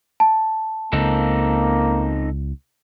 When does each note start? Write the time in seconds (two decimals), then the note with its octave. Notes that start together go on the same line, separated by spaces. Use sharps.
0.20 A5
0.93 C#2 A#3 C4 D#4 A4